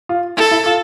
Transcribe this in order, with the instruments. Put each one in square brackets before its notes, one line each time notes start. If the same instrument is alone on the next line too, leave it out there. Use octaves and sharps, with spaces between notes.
[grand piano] F4
[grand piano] E4 [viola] A4
[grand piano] E4
F4